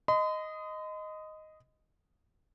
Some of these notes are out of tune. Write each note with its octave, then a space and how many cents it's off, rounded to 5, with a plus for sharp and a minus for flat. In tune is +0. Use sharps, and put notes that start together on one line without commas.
D#5 +0 C6 -45